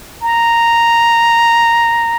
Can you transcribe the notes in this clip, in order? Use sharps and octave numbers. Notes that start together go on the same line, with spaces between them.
A#5